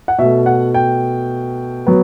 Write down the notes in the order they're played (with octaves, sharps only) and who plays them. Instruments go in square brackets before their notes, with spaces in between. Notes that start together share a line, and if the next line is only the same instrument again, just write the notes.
[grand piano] F#5
B2 A3 E5
F#5
G5
F#3 B3